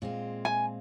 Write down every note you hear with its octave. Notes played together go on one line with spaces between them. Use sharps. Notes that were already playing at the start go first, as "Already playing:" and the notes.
A#2 G#3 C4 F4
G#5